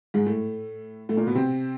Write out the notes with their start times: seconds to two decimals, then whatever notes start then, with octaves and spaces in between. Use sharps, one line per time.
0.14 G#2 G#3
0.26 A2 A3
1.09 A2 A3
1.17 A#2 A#3
1.27 B2 B3
1.35 C3 C4